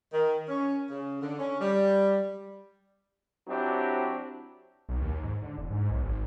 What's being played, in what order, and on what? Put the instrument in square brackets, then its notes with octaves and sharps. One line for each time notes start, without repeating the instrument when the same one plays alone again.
[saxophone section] D#3
C#4
C#3
D3
C#4
G3
[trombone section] F#3 C4 D4 E4 G4
[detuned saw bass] B1
D#2
G#2
D3
E1
G#2
B1
G#1